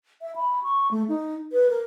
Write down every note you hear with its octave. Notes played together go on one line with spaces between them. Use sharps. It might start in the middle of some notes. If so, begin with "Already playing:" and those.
E5
B5
C#6
A3
D#4
B4
A#4